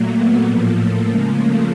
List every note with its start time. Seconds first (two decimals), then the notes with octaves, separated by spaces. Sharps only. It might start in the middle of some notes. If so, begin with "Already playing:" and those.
Already playing: A#2 F#3 A3 A#3
0.16 A3 B3
0.45 A2 F3 A3 A#3
0.75 A3
1.05 C#3 F3 G#3 A#3
1.36 A3